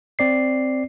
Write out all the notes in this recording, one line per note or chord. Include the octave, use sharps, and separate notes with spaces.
C4 D5 C7